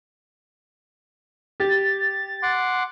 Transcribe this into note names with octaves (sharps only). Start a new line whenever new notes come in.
G4 A6
F#5 C6 D6